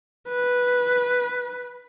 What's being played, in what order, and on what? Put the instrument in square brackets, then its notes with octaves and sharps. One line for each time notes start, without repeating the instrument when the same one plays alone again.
[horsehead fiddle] B4